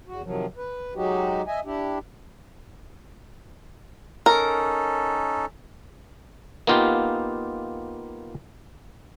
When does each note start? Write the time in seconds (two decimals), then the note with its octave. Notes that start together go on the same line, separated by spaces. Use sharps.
0.07 E2 F#4
0.24 C3 D#3 F3 F#3
0.57 B4
0.95 F#3 G#3 D#4 F#4 G4
1.47 D#5 E5 G#5
1.65 D4 E4 G4
4.26 C#4 D#4 A4 A#4
6.67 A#3 B3 D#4 F4 G4